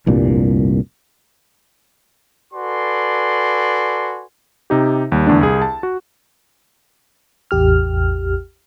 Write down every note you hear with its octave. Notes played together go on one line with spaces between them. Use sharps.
F1 C2 G2 A#2
F#4 A4 B4 D5 G#5 C6
C3 D#4 G4
D#2 G3
E2 D3 A3 D4
C2 G#4
A5
F#4
A1 E2 G4 F6